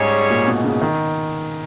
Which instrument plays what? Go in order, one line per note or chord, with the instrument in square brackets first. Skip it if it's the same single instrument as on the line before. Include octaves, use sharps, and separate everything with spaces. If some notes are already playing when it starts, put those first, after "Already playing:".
Already playing: [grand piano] G#2 [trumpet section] G3 C#4 G#4 C#5
[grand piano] A#2
B2
C#3
D#3